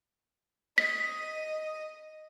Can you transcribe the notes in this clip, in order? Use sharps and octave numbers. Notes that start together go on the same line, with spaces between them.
D#5 B6